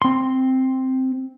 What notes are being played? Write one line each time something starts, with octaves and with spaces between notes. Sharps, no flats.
C4 C6